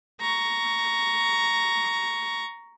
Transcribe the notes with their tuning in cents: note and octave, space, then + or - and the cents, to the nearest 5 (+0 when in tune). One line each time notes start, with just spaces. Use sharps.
A#5 +0 C#6 +10